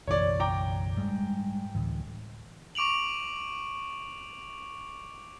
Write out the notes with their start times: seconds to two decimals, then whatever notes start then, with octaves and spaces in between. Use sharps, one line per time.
0.07 F#1 B1 E3 C#5 D5
0.40 G5 A#5 D6
0.97 G#2 G3 G#3
1.75 D2 A2 E3
2.75 C#6 D6 D7 F7 F#7